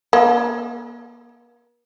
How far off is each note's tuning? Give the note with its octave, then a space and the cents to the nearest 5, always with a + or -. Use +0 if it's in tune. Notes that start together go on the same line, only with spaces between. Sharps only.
A#3 +40